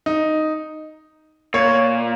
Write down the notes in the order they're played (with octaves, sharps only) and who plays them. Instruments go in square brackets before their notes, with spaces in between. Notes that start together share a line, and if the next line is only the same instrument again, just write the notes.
[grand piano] D#4
[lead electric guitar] A#2 [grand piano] C#5